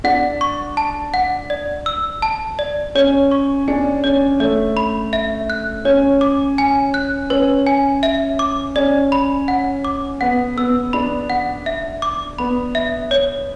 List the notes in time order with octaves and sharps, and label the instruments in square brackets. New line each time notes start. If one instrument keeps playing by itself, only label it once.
[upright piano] D4 [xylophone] F#5
[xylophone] C#6
A5
F#5
D5
E6
A5
D5
[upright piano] C#4 [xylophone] C#5
[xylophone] C#6
[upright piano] D4 [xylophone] G#5
[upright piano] C#4 [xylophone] C#5
[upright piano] A3 [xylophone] C#5
[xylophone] B5
E5
F#6
[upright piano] C#4 [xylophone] C#5
[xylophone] D6
G#5
F#6
[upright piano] C#4 [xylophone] B4
[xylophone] G#5
E5
D6
[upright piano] C#4 [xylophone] D5
[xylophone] B5
F#5
D6
[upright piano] B3 [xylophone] F#5
[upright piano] B3 [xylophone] E6
[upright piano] D4 [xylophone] B5
[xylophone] F#5
E5
D6
[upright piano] B3 [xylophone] B5
[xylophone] E5
C#5